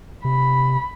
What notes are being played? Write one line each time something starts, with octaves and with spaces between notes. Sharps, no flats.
C3 B5